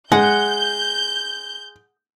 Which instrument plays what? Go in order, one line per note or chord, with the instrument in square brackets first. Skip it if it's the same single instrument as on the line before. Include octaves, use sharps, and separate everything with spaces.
[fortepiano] G#3 [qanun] F#5 [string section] G6